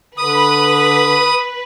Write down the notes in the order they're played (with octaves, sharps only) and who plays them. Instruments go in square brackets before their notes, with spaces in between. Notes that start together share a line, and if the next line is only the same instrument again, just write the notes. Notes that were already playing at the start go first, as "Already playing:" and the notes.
[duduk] D3 [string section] B4 [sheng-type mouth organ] D#6